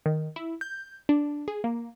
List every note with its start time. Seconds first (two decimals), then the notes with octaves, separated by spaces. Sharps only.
0.06 D#3
0.36 E4
0.61 G6
1.09 D4
1.48 G#4
1.64 A#3